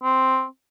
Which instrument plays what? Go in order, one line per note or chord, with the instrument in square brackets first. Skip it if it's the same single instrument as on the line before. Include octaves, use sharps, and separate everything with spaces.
[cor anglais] C4